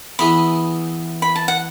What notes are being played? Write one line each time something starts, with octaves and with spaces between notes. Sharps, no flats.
E3 B3 E4 G#4 B5
B5
A5
F#5